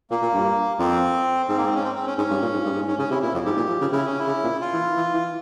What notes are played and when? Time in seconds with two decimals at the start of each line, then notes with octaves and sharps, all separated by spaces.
0.10 A#2 A#3
0.22 A#2
0.34 G2
0.79 F2 C4
1.49 G#2 C4
1.57 A#3
1.66 C4
1.75 C#4
1.84 C4
1.95 C4
2.07 C#4
2.18 G#2 C#4
2.30 G2
2.42 A#2
2.53 G#2
2.65 G2
2.76 G#2
2.87 G#2 C#4
2.99 C#3 C#4
3.11 C3 E4
3.22 A#2 E4
3.34 F2
3.45 G#2 G4
3.57 A#2
3.68 F3
3.81 C#3
3.92 C#3 E4
4.06 C#4
4.19 E4
4.27 C#3
4.44 A#2
4.61 F4
4.73 E3
4.96 E3
5.14 E3